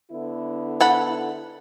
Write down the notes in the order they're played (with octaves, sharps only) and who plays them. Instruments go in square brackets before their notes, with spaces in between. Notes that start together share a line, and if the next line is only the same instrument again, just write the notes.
[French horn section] D3 B3 E4
[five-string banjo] A4 F#5 B5